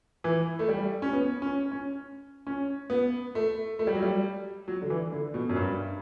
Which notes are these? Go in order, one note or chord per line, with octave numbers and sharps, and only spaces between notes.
E3
A3
G3
C#4
B3
C#4
C#4
C#4
B3
A3
A3
G3
F#3
G3
F#3
D3
E3
D3
B2
F#2
G2